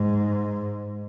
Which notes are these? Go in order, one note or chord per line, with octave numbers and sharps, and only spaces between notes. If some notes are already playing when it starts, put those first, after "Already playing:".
Already playing: G#2